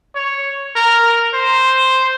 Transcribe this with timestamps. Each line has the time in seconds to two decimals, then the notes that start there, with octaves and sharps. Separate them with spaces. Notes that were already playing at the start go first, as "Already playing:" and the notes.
0.15 C#5
0.75 A#4
1.34 C5